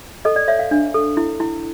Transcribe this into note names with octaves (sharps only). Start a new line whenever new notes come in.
A4 D#5
D5
C#5 E5
F5
D4
A4
E4
E4